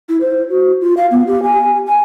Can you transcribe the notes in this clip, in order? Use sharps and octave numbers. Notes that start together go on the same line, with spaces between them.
E4
C5
F#4
F4
F5
B3
G4
G#5
G#5